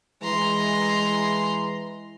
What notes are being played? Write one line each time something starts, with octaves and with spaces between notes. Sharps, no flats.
E3 G#3 A#5 C6